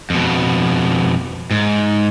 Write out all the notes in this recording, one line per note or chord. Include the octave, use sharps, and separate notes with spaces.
F2 B2
G#2